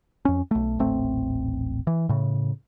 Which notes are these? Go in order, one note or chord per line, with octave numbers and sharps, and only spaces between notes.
F2 C#4
B1 A3
D#1 A1 A3 C4
E3
A2 C#3